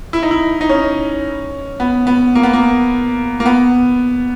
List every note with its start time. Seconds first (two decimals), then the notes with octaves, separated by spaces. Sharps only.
0.13 E4
0.23 D#4
0.31 E4
0.61 D#4
0.69 C#4
1.80 B3
2.07 B3
2.35 A#3
2.43 B3
2.53 A#3
3.40 A#3
3.46 B3